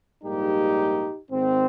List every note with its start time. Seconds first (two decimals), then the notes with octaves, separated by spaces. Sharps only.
0.23 A#1 G#2 G3 A#3 D#4 G4
1.30 G#1 G#2 D#3 C4